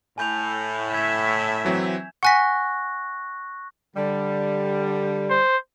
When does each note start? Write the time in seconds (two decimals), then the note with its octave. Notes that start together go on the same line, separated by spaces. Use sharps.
0.18 A2 G#5 G6 F7
0.94 E5 G#6 E7
1.65 E3 F#3 C4
2.23 F#5 G#5 C#6 F#6 A#6 B6
3.96 D3 G3
5.30 C5